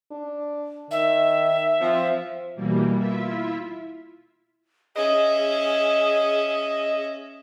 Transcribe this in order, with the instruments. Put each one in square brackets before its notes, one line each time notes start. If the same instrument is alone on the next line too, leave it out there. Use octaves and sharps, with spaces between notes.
[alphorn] D4
[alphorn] D#3 [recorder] E5
[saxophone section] F3 [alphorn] C4
[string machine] B2 E3 G3 A#3
E4 F4 E5
[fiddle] C#4 E5 [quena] G#4 [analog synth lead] D#5